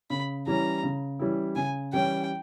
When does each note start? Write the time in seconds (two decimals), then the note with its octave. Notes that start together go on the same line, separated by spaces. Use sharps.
0.10 C#3 B5
0.47 E3 G3 C#4 E4 A#5
0.83 C#3
1.19 E3 G3 C#4 E4
1.56 C#3 G#5
1.93 E3 G3 C#4 E4 G5